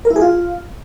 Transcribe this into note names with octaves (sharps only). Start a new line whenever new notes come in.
A#4
E4
G#4
F4